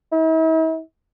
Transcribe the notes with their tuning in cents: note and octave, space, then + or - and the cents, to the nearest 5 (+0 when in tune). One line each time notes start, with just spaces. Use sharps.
E4 -45